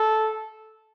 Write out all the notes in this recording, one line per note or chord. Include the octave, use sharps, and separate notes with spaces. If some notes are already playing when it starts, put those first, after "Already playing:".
Already playing: A4